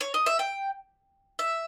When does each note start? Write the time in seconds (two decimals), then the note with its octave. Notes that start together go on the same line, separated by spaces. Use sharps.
0.01 C#5
0.14 D#5
0.26 E5
0.39 G5
1.39 E5